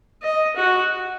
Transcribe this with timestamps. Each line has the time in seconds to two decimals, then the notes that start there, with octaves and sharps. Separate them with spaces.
0.22 D#5
0.56 F#4